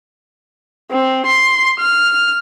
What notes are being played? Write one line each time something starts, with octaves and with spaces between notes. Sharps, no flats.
C4
C6
F6